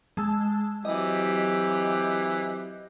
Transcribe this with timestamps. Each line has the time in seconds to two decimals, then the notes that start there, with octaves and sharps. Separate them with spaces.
0.17 G#3 A5 E6
0.85 E3 F#3 C4 G4 D#5